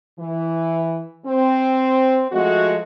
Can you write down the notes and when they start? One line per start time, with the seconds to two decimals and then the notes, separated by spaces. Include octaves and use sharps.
0.19 E3
1.26 C4
2.32 F3 G#3 A3 F#4